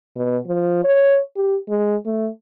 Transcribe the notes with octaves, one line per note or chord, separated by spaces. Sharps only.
B2
F3
C#5
G4
G#3
A3